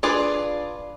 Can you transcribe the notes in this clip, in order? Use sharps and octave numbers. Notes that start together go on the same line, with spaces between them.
D4 F4 G#4 B4 D5